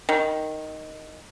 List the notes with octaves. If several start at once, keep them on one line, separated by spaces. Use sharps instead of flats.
D#3